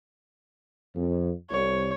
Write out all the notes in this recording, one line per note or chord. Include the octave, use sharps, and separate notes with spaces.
F2
C2 C#5